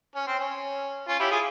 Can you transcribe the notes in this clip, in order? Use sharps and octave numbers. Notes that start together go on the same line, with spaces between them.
C#4
C4
C#4
C#4 F4
E4 G4
F4 G#4